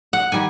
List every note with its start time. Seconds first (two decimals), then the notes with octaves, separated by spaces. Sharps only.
0.13 F#5
0.32 D#3 G3 G#5